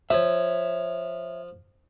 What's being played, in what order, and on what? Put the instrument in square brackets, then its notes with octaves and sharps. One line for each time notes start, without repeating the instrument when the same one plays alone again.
[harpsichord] F3 [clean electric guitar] C#5 E5